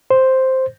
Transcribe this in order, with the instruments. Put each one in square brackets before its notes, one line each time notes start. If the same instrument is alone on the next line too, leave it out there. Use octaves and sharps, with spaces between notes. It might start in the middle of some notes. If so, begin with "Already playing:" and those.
[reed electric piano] C5